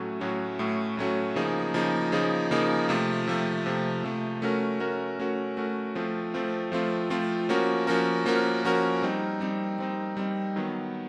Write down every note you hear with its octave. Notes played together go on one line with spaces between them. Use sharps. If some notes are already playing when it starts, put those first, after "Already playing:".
Already playing: A2 F#3 A3 C#4 F#4
A2 F#3 A3 C#4 F#4
A2 F#3 A3 C#4 F#4
A2 F#3 A3 C#4 F#4
C#3 F3 A#3 D#4 G#4
C#3 F3 A#3 D#4 G#4
C#3 F3 A#3 D#4 G#4
C#3 F3 A#3 D#4 G#4
C3 F3 A3
C3 F3 A3
C3 F3 A3
C3 F3 A3
A3 C#4 F#4 A#4
A3 C#4 F#4 A#4
A3 C#4 F#4 A#4
A3 C#4 F#4 A#4
F3 A3 C4 F4
F3 A3 C4 F4
F3 A3 C4 F4
F3 A3 C4 F4
F3 A#3 C#4 F#4 A#4
F3 A#3 C#4 F#4 A#4
F3 A#3 C#4 F#4 A#4
F3 A#3 C#4 F#4 A#4
G3 C4 D#4
G3 C4 D#4
G3 C4 D#4
G3 C4 D#4
D#3 F#3 B3